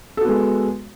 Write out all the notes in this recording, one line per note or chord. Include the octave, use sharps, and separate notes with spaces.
G#3 B3 F#4 A4